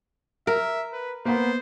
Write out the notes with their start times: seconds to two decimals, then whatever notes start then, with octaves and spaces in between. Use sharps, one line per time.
0.47 A#4 E5
0.93 B4
1.25 A#3 B3 C5